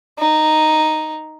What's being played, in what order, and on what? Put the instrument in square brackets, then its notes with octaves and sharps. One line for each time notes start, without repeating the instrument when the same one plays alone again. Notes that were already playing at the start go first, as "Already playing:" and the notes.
[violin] D#4